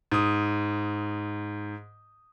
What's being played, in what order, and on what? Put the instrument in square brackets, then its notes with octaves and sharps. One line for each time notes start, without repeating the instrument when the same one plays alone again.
[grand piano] G#2 D#6